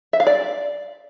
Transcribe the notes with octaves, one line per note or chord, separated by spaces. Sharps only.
E5
F5
D5